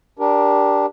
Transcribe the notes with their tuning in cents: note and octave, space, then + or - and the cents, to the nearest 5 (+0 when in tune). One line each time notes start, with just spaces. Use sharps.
D4 -5 G4 +0 A#4 +15